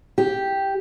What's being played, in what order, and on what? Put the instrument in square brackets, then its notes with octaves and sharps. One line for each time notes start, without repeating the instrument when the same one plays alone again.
[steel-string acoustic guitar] G4